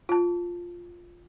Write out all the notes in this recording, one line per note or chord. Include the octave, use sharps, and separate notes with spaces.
F4 A5